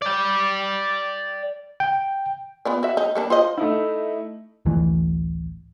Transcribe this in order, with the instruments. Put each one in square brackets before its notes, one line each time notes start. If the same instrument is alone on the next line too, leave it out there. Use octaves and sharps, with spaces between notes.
[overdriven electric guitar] D5 G5
[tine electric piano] G5
[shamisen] B3 F4 D5
F#4 E5
D#4
G3 A#3 D4
F4 C5 D#5
[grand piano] A3 D#4 E4
[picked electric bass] D1 A1 A2 E3